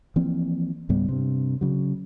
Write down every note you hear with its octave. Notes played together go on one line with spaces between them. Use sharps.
E3 F3 A#3 C4
C#2 G#2 G3 B3
G2 C3
C#3 F#3